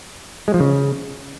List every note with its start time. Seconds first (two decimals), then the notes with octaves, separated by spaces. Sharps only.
0.48 G#3
0.54 F3
0.60 C#3